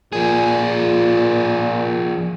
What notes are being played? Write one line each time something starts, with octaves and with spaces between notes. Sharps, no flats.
A#2 F3 G#4